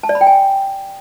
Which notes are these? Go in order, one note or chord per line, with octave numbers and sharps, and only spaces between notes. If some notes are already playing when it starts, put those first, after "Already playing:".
A5
D5
B5
G5
G#5